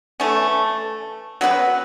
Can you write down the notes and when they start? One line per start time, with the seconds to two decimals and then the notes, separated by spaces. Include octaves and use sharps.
0.20 E3 A3 C#4
1.41 F#3 B3 F#4 B4